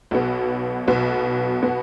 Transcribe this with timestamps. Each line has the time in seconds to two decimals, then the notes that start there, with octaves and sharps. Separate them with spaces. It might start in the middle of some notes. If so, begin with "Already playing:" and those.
0.11 B1 B2 B3
0.88 B1 B2 B3
1.63 B2 B3 F#4